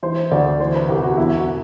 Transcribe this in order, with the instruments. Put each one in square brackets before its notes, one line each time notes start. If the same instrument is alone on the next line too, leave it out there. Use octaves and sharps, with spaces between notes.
[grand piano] E3 C5
D2 D5
E3 C5
B4
C2 G4
F#4
E2 E4
F#4
B2